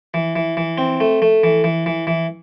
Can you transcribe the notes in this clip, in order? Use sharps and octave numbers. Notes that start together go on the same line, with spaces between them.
E3
E3
E3
C4
A3
A3
E3
E3
E3
E3